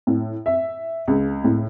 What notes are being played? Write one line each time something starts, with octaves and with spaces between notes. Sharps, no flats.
A2
E5
C#2
A2